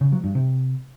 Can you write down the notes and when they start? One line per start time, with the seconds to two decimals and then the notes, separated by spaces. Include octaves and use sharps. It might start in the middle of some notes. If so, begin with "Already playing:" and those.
0.01 C#3
0.12 F#3
0.24 G2
0.35 C3